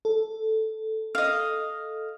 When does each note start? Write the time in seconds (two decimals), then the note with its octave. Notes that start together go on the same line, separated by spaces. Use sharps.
0.05 A4
1.15 D#5 F5